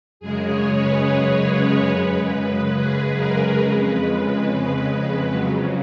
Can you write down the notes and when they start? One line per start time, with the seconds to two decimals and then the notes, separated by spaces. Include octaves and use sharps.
0.20 F#2 C#3 G#3 G#4
0.49 C#5
0.77 B4
1.89 F#2 C#3 G#3
2.73 G#4
3.16 A#4
3.58 F2 C#3 G#3 B4
5.26 F2 C#3 F#3